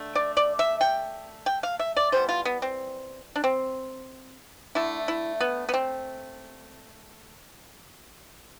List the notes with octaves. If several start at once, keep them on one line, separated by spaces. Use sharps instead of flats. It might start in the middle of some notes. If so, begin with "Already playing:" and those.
Already playing: D3 A3
D5
D5
E5
G5
G5
F5
E5
D5
E3 G3 B3 C5
F4
B3
C4
D4
C4
D3 A3 E4
E4
B3
B3
C4